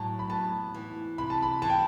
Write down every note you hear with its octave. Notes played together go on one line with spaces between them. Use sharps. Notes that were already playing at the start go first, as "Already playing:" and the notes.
Already playing: A2 F#3 A5
B5
B3 A5
E3
C3 B5
A5
B5
E3 A5
G5